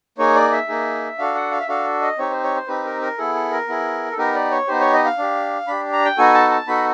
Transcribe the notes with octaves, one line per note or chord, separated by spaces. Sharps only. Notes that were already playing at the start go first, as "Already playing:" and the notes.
A#3 D#4 G#4 C#5
D5
E5
A#3 D#4 G#4
D4 F#4 A4 F5
F#5
F5
E5
D4 F#4 A4 F5
D#5
C4 D#4 G4 C#5
C5
C#5
C5
C4 D#4 G4 B4
A#4
A#4
B3 E4 G#4 A4
A4
A#4
B3 E4 G#4
A4
B3 D#4 G4 A#4
D5
C#5
B3 D#4 G4 C5
C#5
D#5
F5
D4 G4
D4 G4 B5
A#5
G5
B3 D#4 F#4 A4 G#5
A5
A5
B3 D#4 F#4 A4 B5